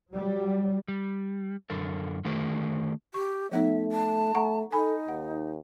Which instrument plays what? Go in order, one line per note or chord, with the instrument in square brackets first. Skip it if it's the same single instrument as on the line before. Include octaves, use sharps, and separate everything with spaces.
[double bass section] F#3 G3
[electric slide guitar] G3
F#2 D3 A4 A#4
D3 D#3 A3 F#4 G#4 A#4
[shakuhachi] G4 [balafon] C#6
[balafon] F3 B3 D#4 [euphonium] A3 [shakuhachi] E5
[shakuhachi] A5
[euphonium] A3 [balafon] F#5 A#5 C#6
[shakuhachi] D#4 [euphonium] A4 [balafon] G#5 B5
[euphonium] D#2 [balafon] F#5